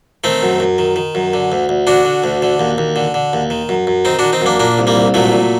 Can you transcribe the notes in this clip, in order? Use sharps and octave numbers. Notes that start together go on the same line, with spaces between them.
D#3 A3 C4
F#2
F#2
D#3
D#3
F#2
D3
D2
D2
D3 D4 F#4
D3
D2
D3
D#2
D#2
D3
D3
D#2
D#3
F#2
F#2
D#3 C4 D#4
D#3 D4 F#4
C4 D#4
F#2 A#3 D4
A#2 A#3 D4
C2
G3 A#3
C2
A#2 F#3 A3
A#2